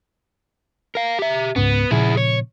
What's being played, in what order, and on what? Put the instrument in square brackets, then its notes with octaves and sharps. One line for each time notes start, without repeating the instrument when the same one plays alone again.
[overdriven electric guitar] A#4 F5
G4 E5
[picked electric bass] C#2 G#2 C#4 [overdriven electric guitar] B3
[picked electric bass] A#2 C#3 F3 [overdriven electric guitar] E4 G#4
[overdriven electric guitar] C#5